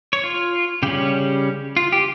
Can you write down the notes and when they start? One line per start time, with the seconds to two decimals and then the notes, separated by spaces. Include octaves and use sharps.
0.13 C#5
0.24 F4
0.83 C#3 G3 C#4 G4
1.77 F4
1.92 G4